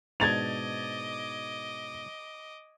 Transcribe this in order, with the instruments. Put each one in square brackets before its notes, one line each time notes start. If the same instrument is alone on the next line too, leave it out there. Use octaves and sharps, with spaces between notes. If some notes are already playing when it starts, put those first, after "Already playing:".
[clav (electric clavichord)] G#2 B2 D4 [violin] D#5 D6 [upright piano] G#6 A6 F7